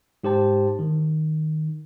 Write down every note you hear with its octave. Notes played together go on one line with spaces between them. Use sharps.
G#2 G4 C5 A5
D#3